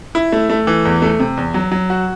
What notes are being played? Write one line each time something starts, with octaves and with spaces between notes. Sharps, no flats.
E4
A3
A3
E3
E2
A3
C3
E2
F#3
F#3
F#4